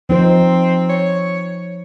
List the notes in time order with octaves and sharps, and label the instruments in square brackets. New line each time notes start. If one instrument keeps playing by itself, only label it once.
[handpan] F3 D#4 C5 [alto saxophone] C4
[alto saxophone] C#5